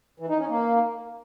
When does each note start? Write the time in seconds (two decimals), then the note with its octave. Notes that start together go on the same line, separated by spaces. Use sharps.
0.20 E3
0.29 D#4
0.39 C#4
0.48 A#3